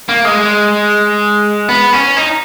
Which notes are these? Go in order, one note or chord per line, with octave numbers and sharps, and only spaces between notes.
A#3
G#3
B3
C#4
D#4